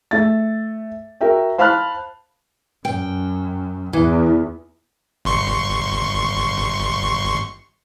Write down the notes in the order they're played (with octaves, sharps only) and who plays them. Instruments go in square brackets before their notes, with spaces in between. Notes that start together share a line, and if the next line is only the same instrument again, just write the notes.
[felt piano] A3 E5 A6
F#4 A#4 E5 G5
C5 F5 A5 B5 F6 F#6
[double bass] F#2 [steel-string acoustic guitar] G5
[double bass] E2 [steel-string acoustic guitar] E3
[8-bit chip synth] G1 C6 C#6